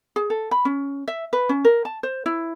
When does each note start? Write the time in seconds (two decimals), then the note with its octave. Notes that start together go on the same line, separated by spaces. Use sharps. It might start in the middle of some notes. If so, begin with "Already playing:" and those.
0.16 G#4
0.30 A4
0.51 B5
0.65 C#4
1.08 E5
1.33 B4
1.49 C#4
1.64 A#4
1.85 A5
2.03 C5
2.26 E4